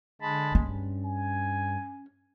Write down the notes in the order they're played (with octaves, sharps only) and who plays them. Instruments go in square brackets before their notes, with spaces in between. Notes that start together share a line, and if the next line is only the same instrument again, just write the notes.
[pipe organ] D3 A5 B5 [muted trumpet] G#3
[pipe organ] G2 [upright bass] C#4
[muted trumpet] G#5